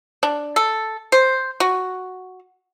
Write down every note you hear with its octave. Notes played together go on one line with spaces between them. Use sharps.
D4
A4
C5
F#4